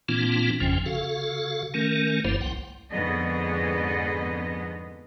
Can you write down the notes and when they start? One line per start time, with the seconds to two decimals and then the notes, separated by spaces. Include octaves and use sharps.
0.08 A#2 E3 A#3 C4 D4 F4
0.60 G#1 F2 C#3 F3 C#4 G5
0.86 C#3 F#4 A4 F5
1.74 D#3 A3 C#4 A#4
2.24 F#1 G2 F3 A#3 E4 C5
2.41 C2 F#5 G5
2.92 F2 G#2 D3 B3 G#4 D#5